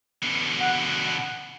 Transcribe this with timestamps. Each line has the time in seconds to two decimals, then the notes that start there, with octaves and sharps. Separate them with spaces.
0.23 B2 D3
0.61 F#5